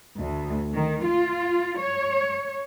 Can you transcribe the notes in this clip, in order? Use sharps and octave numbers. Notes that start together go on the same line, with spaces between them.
D2
D#3
F4
C#5